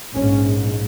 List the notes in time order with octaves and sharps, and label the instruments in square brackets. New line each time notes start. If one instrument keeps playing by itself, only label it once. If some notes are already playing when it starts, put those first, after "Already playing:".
[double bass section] A#1 G#2 C#4